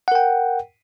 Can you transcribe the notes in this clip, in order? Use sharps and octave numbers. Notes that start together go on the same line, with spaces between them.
A#4 F#5 G5